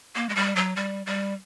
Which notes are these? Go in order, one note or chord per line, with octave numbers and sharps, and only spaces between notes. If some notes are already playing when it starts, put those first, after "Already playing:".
A#3
G#3
G3
F#3
G3
G3